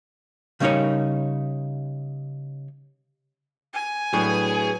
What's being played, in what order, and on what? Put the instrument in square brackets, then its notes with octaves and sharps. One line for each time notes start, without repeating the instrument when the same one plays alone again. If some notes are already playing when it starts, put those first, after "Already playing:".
[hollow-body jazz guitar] C#3 G3 C#4 D#4 A#4 C#5
[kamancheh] G#5
[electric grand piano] A2 D4 [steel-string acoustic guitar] F#3 B4 [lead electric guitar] G#4